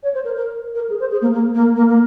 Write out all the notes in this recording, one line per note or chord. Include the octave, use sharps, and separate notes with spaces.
C#5
C5
A#4
A#4
A#4
G#4
C5
G#4
A#3
A#3
A#3
A#3
A#3